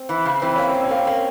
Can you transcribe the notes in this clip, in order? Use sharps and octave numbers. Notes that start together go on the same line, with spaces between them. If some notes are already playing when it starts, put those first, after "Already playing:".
Already playing: C4
E3
C#3
E3 C4
A#3 C#4
A2 C4
C#4
A#3
C4
A#3